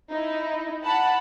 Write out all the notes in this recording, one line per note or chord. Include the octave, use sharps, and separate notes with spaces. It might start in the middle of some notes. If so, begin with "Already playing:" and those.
D#4 E4
F#5 A5 B5